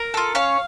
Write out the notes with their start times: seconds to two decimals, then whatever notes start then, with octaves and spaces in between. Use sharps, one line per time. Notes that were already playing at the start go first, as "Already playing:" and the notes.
Already playing: A#4
0.14 F4 A4
0.35 C#4 C#5 F5